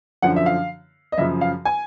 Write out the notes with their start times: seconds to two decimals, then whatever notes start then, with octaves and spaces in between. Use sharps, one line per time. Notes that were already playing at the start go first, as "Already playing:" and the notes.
0.22 F#2 D3 F3 F#5
0.36 E5
0.46 F5
1.12 D#5
1.18 F#2 C#3 F3 E5
1.41 F5
1.65 G#5